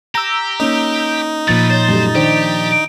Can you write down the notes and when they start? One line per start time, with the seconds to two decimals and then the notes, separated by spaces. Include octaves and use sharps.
0.15 G4 A#5 E6
0.60 A#3 C#4 D#4
1.48 A#2 F3 A3 B4 A6
1.70 C5 C#5
1.89 F#2 G3 A3
2.15 D#3 D4 G4 C5